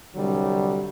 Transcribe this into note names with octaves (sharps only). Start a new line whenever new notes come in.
C2 D3 F#3 G3